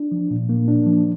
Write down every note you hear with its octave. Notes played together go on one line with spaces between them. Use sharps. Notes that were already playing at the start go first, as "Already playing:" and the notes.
Already playing: D4
F3
A#2
A#3
D4
F3